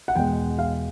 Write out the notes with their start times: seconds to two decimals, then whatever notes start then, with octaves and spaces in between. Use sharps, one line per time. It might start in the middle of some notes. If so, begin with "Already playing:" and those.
0.08 F#5
0.15 E2 B2 G#3 G5
0.59 F5